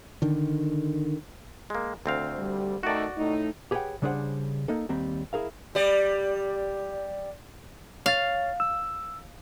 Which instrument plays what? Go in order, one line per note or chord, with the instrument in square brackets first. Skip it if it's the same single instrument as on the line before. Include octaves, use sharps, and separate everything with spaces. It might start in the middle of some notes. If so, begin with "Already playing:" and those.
[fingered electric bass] D3 D#3
[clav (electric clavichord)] G#3 A#3
D2 C4 F5
[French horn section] G3
[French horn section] D#3 A3 [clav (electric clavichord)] F#4 D5
[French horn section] A2 A3 D#4
[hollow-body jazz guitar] G4 G#4 B4 C#5 F#5 G5
C#3 G3 D4 G#4 C5 F#5
A#3 D#4 A4
D#2 G3 C4 A#5
E4 G#4 A#4 F5
[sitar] G3 D5
[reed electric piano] C#5 A6 [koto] F5
[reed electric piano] E6